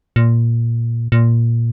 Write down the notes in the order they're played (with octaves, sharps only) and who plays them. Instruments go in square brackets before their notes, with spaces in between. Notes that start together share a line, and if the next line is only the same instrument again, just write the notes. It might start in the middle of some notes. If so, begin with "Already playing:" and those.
[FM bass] A#2
A#2